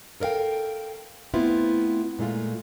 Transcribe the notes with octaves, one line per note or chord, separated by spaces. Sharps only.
A4 A#4 D5 F5 G5
A3 B3 C4 E4 F4
A#2 G#3 A3 F4